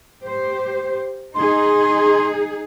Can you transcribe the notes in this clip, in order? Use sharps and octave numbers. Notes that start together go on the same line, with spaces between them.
G4 C5
D#4 G#4 C6